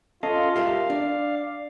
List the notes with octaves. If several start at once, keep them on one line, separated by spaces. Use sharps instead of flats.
C#4 F4 A4 D#5 F5
G4 A#4 E5 F5
D4 D5